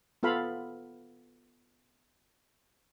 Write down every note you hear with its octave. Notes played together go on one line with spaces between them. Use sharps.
B3 F4 A4 F5 B5